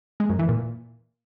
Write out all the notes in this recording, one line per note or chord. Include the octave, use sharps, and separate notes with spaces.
G#3
F#2
E3
A#2